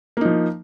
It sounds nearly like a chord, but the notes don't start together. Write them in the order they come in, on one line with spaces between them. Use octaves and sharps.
A#3 D#4 F3